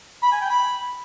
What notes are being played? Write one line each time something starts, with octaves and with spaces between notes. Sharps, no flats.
B5
G#5
G5
B5